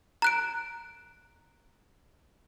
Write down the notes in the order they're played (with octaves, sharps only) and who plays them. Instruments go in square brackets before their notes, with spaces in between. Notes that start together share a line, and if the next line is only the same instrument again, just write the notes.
[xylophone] A#5 F#6 D7